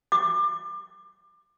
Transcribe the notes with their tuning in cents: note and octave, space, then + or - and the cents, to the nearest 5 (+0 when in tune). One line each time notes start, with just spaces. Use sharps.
D6 +25